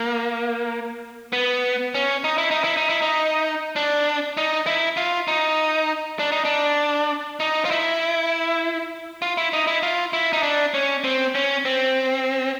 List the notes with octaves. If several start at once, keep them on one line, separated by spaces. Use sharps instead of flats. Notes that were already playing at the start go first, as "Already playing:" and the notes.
Already playing: A#3
B3
C#4
D#4
E4
D#4
E4
D#4
E4
D#4
D4
D#4
E4
F4
D#4
D4
D#4
D4
D#4
F4
E4
F4
E4
D#4
E4
F4
E4
D#4
D4
C#4
C4
C#4
C4